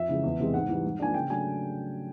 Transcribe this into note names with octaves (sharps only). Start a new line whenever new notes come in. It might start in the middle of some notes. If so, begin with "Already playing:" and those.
Already playing: F2 E5
C#3 E3 G#3
E2
C3 E3 G#3 C4
G#2 F#5
E3 G3
G#2
F3 A#3 D4 G#5
C#3 G5
F#3 A3 D4 G#5